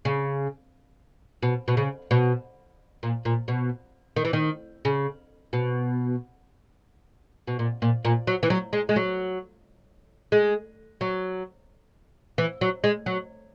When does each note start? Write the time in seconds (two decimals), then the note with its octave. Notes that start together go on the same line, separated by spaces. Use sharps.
0.05 C#3
1.43 B2
1.68 B2
1.77 C#3
2.11 B2
3.03 A#2
3.25 A#2
3.48 B2
4.16 D#3
4.25 E3
4.33 D#3
4.85 C#3
5.53 B2
7.47 B2
7.59 A#2
7.82 A#2
8.05 A#2
8.27 F#3
8.43 E3
8.50 F#3
8.73 G#3
8.89 G#3
8.96 F#3
10.32 G#3
11.01 F#3
12.38 E3
12.61 F#3
12.84 G#3
13.06 F#3